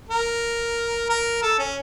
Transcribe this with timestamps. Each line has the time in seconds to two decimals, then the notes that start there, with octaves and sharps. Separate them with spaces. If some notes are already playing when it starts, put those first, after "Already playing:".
0.09 A#4
1.10 A#4
1.42 A4
1.59 C#4